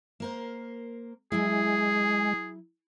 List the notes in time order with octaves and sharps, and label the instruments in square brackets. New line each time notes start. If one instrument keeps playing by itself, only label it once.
[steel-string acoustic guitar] A#3 A#4 C5
[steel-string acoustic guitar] F#3 E4 [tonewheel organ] G#3 [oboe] G#4